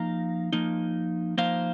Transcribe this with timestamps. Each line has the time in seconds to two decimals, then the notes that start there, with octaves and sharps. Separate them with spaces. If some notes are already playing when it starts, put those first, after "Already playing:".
Already playing: F3 A#3 D#4 F5 A#5
0.53 F3 A#3 D#4
1.38 F3 A#3 D#4 C5 F5